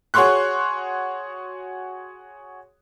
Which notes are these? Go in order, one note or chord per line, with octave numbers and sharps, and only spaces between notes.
F#4 G#4 C#5 C6 C#6 F#6